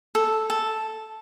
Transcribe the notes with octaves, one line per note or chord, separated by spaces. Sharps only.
A4
A4